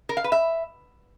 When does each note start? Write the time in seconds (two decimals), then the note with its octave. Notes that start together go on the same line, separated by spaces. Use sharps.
0.09 A#4
0.17 F5
0.24 B4
0.32 E5